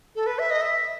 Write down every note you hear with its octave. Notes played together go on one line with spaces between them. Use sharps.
A4
B4
E5
D#5
E5